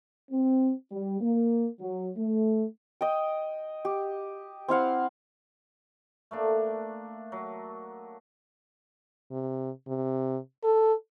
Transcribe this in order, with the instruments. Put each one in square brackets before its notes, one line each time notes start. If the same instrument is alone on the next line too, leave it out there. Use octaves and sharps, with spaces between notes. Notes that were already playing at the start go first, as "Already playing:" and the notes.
[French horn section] C4
G3
A#3
F#3
A3
[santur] D#5 G5
G4
C4 E4 F5 F#5
[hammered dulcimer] A3 A#3 D4
F#3
[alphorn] C3
C3
A4